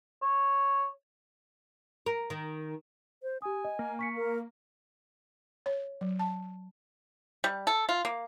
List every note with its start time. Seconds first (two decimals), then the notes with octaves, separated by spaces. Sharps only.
0.22 C#5
2.06 A#4
2.30 D#3
3.23 C5
3.42 G4 G#5 D#6
3.64 D#5
3.79 A#3
3.99 C#6 B6 C#7
4.16 A#4
5.66 C#5
6.01 F#3
6.19 A5
7.44 G3
7.67 A4
7.89 F4
8.05 A#3